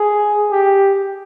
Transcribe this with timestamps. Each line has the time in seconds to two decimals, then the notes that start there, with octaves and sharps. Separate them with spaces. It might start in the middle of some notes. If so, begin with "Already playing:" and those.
Already playing: G#4
0.51 G4